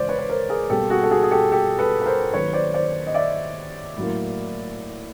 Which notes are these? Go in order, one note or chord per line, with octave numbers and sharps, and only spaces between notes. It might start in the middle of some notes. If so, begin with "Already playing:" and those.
Already playing: C#3 E3 G#3 C5 D5
B4 C#5
B4
A#4 C5
G#4 A#4
B2 G3 A#3 G4 A4
F#4 G#4
A4
F#4 G#4
G#4
G4 A4
G4 A4
A4 B4
B4
A#4 C5
D#3 F#3 A#3 B4 C#5
C5 D5
C5 D5
D#5
D5 E5
A2 F#3 A#3